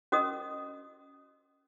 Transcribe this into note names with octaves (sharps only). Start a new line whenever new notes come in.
C#4 F#4 A#4 D#5 D#6